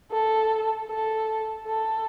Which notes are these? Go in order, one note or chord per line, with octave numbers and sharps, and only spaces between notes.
A4
A4
A4